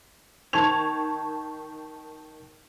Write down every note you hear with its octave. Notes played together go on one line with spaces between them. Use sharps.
D#3 A5 C#6 G#6 F7